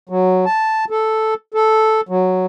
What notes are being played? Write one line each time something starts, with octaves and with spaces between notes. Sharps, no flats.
F#3
A5
A4
A4
F#3